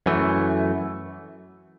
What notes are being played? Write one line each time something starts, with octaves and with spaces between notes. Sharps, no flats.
F#2 E3 A3